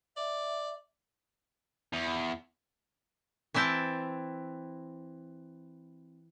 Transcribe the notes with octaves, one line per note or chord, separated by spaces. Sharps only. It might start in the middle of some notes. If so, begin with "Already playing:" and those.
D5 E5
E2
E3 C4 E4 G5 A5